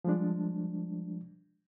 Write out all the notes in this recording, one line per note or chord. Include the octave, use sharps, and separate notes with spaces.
F3 G3 G#3 D4